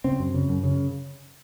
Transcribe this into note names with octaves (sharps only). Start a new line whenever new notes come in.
C#3 C4
F#2
C#3
F#2
C#3